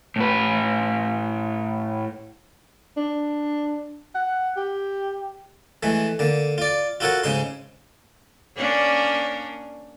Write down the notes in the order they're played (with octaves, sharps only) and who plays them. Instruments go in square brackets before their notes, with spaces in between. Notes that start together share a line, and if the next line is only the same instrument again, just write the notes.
[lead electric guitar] A2 B4
[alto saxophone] D4
F#5
G4
[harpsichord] E3 G#3 A3
D3 A#3
F4 D5
F4 F#4 A4 A#4 C#5 F#5
G#2 C#3 D#4 C6
[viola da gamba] A#3 C#4 D4